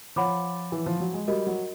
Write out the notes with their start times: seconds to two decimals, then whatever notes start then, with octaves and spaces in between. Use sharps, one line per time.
0.16 F3 C#5 F#5 B5 D6
0.72 E3
0.86 F3
1.00 F#3
1.14 G#3
1.28 G3 F#4 A#4 D#5
1.47 F#3